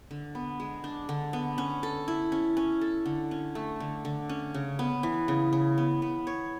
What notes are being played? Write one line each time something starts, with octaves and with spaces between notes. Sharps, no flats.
D3
B3
G#3
D4
D3
B3
C#4
A4
E4
C#4
C#4
A4
D3
C#4
A3
D3
D3
C#4
C#3
B3
E3
C#3
C#3
B3
B3
C#5